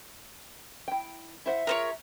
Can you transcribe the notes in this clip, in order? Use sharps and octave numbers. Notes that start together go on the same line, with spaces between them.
E4 G5
E4 C5 E5 F#5
F4 G#4 A#4 C5 C#5